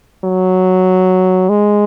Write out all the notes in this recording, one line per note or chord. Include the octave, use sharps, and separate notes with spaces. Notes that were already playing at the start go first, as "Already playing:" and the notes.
F#3
G#3